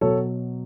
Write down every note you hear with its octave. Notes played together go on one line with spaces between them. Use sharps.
B2 F#3 A4 C#5